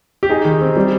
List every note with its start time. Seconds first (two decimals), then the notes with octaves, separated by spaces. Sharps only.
0.23 G4
0.29 D#4 G#4
0.45 D#3
0.61 C4
0.77 G3